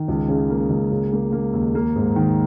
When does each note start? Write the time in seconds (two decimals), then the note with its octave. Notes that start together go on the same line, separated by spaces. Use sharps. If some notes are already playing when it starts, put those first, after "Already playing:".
Already playing: D#3
0.08 C#2
0.28 C#3
0.50 A#3
0.70 C#2
0.91 C#3
1.13 A#3
1.32 A#3
1.53 D#2
1.75 A#3
1.96 G#2
2.16 D#3